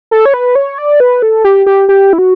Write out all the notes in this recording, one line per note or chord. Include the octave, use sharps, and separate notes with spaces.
A4
C#5
B4
C#5
D5
B4
A4
G4
G4
G4
E4
F#4